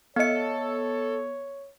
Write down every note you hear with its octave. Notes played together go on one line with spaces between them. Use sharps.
B3 A4 C#5 D#5 F5 C#7